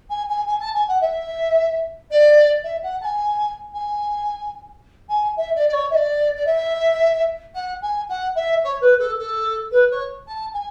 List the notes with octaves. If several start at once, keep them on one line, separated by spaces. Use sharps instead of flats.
G#5
G#5
G#5
A5
G#5
F#5
E5
D5
E5
F#5
A5
G#5
G#5
G#5
E5
D5
D5
C#5
E5
D5
D5
E5
F#5
G#5
F#5
E5
C#5
B4
A4
A4
B4
C#5
A5
G#5